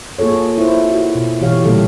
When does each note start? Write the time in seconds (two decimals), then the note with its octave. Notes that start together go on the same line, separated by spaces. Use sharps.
0.19 A#3 F4 G#4 A4 C#5
0.58 E4 F4 C5
0.91 F#4
1.15 B2
1.41 B2 E3 G4 C#5 F5
1.64 A#2 D3 G3 A#3 G4 A4